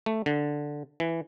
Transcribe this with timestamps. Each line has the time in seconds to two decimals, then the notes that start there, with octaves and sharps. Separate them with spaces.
0.06 A3
0.26 D3
1.00 E3